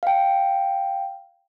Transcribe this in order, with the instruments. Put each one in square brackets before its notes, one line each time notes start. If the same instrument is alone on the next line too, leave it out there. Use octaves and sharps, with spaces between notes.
[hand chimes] F5 G5